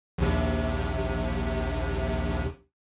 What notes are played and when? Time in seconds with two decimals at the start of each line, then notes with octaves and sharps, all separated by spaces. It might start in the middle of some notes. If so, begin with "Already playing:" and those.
0.18 A#1 D#2 C3